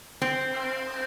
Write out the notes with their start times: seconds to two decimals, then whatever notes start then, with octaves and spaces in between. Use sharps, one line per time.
0.22 C4